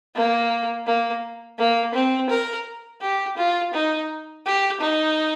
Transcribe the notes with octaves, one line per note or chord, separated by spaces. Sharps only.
A#3
A#3
A#3
C4
A#4
G4
F4
D#4
G4
D#4